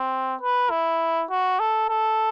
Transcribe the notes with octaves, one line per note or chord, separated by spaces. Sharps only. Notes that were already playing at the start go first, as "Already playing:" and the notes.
Already playing: C4
B4
E4
F#4
A4
A4